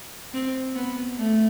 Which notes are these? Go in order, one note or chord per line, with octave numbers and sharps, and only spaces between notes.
C4
B3
A3